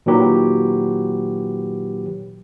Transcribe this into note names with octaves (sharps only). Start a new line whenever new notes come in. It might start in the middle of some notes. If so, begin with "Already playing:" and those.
A#2 D#3 F#3 G4 B4